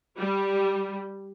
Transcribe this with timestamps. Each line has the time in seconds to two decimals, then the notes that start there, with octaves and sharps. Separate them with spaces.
0.17 G3